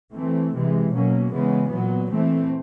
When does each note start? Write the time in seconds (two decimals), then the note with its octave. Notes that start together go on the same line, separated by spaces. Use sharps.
0.13 E3 A3 C4
0.53 C3 E3 G#3
0.92 B2 F#3 A#3 C#4
1.31 C#3 E3 G#3 B3
1.70 A#2 F#3 B3
2.10 E3 A3 C4